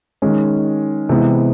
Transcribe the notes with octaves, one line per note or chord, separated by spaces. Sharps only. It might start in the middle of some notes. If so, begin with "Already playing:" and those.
D#3 G#3 C#4
C3 E3 G#3 B3